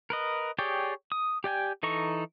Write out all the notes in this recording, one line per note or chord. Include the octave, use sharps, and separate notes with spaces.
A#4 B4 D#5
G4 G#4 C#5 D5 G5
D#6
G4 D5 G5 G#5
E3 D#4 A4 A#5 C#6